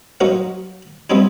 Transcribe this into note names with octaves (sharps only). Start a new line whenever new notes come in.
F#3 D#4 F#4 A#4 C5 F5
F3 G3 B3 C4 D#4 E4